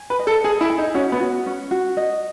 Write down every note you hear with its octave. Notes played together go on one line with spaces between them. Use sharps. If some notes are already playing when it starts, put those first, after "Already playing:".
Already playing: G#5
B4
D#5
A4
G#4 D#5
E4
G#5
D#4
C#4 F#4
B3
F#4
C#4
F#4
D#5